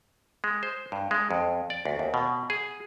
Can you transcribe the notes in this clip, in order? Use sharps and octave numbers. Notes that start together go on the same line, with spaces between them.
G#3
C5
G2
G#3
F2
D5
D2
D#2
B2
G#4